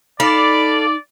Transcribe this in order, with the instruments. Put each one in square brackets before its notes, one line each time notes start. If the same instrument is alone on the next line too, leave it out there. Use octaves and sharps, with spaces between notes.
[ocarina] D#4 [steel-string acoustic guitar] A4 F5 [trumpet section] D5 [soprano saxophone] B5